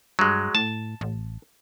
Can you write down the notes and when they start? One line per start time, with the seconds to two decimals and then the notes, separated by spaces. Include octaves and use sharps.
0.19 G2 F#3 G#3
0.55 A2 A5
1.01 A1